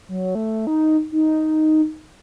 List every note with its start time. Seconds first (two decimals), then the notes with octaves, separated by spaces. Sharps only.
0.09 F#3
0.35 A3
0.67 D#4
1.12 D#4